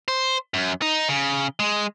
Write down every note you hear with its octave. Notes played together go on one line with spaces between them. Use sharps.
C5
F#2
D#4
C#3
G#3